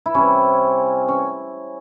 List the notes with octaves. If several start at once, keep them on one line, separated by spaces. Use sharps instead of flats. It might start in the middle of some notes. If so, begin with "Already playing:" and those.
E4
C3 G3 C4 C#4
C#4